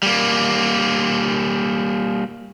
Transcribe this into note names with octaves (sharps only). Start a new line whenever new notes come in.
G3 A#3